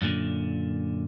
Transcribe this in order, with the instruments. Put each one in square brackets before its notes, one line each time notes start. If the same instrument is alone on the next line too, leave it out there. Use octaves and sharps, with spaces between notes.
[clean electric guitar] F#2 A#2 D3